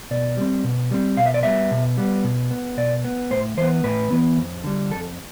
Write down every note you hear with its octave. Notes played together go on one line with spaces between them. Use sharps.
B2 D5
G3 C4
B2
G3 C4
B2 F5
E5
D5
G3 B3 E5
B2
G3 B3
B2
B3
B2 D5
B3
A2 C5
E3 B3 C5
A2 B4
E3 B3
F2
D3 G3
F2 A4